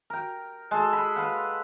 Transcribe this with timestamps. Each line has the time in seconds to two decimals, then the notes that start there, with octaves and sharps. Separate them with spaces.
0.10 A#4 G5
0.71 G#3 A4
0.93 B5
1.16 B4 F5 F#5